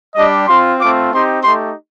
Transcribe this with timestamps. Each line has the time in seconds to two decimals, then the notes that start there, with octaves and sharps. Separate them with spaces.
0.16 G3 D4 G4 D#5
0.47 C4 F4 C6
0.80 A3 C4 F4 D6
1.12 C4 D#4 G4 C6
1.43 A3 D#4 G4 C6